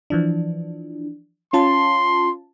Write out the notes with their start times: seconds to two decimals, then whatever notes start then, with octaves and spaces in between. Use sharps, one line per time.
0.10 E3 F3 D4
1.53 C#4 F4 A5 C6